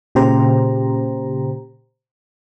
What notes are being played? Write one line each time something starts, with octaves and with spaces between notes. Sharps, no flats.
A#2 C#3 G4 C5 A#5